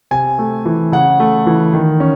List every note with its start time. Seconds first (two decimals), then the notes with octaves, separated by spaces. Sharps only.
0.11 C3 G#5
0.39 A3
0.65 E3
0.92 C#3 F#5
1.20 A3
1.46 E3
1.73 D#3
2.00 C#4